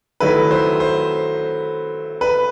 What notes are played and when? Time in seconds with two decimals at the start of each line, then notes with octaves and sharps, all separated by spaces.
0.20 D#3 F#3 A3 E4 B4
0.51 C5
0.80 C5
2.21 B4